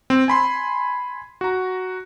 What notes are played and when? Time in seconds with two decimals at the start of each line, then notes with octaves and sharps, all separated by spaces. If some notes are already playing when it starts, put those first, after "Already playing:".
0.10 C4
0.28 G#5 B5 C6
1.41 F#4 A#5